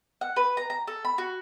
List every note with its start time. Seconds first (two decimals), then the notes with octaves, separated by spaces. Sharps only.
0.21 F#5
0.36 B4
0.57 A#5
0.70 A#5
0.87 A4
1.05 B5
1.18 F#4